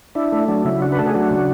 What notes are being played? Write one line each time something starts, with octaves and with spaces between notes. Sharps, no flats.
D4 E4
A3
F#3 D4
C#3 E4
D4 F#4
B4
A3 A4
G#4
F#3 D4 F#4
C#3